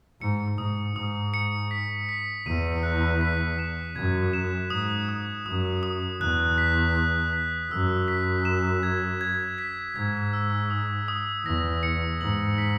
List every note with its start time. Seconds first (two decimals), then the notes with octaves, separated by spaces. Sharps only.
0.21 G#2 C#7
0.58 G#2 D#6
0.96 G#2 D#6
1.34 C#7
1.71 B6
2.09 B6
2.46 E2 D#7
2.83 F#6
3.21 B6
3.59 E7
3.95 F#2 G#6
4.33 E7
4.70 G#2 D#6
5.09 D#6
5.46 F#2 D#6
5.83 D#6
6.21 E2 F#6
6.58 B6
6.96 F#6
7.33 B6
7.71 F#2 E6
8.08 B6
8.45 E7
8.83 G#6
9.21 G#6
9.58 B6
9.95 G#2 G#6
10.33 E6
10.70 D#6
11.08 D#6
11.45 E2 A#6
11.83 C#7
12.21 G#2 F#7
12.58 B6